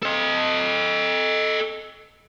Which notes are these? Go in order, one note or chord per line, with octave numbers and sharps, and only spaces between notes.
A4 D#5